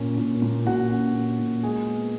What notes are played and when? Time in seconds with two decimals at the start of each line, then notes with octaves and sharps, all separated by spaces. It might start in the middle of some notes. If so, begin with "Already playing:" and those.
Already playing: A#2 C#4
0.18 A#2
0.42 A#2
0.66 A#2 F#4 F#5
0.91 C#4
1.15 A#2
1.39 A#2
1.63 G#3 G#4 G#5
1.88 B3